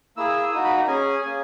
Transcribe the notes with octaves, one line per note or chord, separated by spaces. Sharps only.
A#3 E4 G#4 E6
A#3 D#4 F#4 D#6
B5
A#5
C#4 G#4 G#5
A#3 C#4 G#4